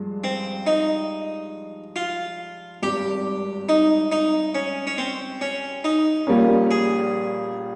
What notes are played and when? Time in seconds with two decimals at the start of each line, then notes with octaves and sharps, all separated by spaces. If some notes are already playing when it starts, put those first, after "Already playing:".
Already playing: G2 F3 G#3
0.24 C4
0.67 D#4
1.96 F4
2.82 G#1 G2 G3 G4
3.69 D#4
4.12 D#4
4.55 C#4
4.87 C#4
4.98 C4
5.41 C#4
5.84 D#4
6.27 A#1 A#2 G3 A#3 C#4
6.71 G#4